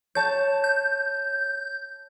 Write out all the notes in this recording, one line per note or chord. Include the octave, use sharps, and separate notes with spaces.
C#5 A5 G6
G6